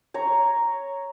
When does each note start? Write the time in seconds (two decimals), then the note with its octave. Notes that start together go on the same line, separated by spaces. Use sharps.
0.14 C#5 A#5